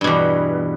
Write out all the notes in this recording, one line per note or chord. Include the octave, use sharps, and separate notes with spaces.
E2 G2 B2